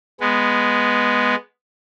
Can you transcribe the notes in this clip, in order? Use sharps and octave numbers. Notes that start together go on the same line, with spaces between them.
G#3 B3